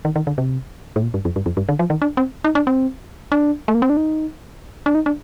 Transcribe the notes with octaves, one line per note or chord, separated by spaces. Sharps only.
D#3
D#3
D3
C3
A2
A#2
G2
F2
G2
F2
G2
D3
F3
D#3
D4
C4
D#4
D4
C4
D4
A3
A#3
C4
D4
D#4
D4
D#4
D4